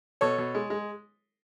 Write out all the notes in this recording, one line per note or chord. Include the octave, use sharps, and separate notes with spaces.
B2 A4 C#5
B2
G#3
G#3